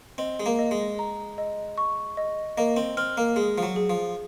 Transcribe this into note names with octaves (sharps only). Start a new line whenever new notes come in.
C4 D#5
G#3
A#3
D#5
G#3
A#5
D#5
C#6
D#5
A#3 D#5
C4
C4 F6
A#3
G#3 G#4
F3
F#3
G#4
F3